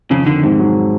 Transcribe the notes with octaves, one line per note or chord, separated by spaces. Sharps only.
F2 C#3
D3 D#3
G#2 C3
F#3